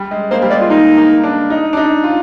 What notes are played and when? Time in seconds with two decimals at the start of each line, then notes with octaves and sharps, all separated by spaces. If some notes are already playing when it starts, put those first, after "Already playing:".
Already playing: G3
0.11 G#3
0.31 A#3 C5
0.42 G3
0.50 G#3 D5
0.61 F4
0.70 A#3 D#4
0.97 A#3
1.23 D4
1.50 D#4
1.73 D4
1.77 D#4
2.03 F4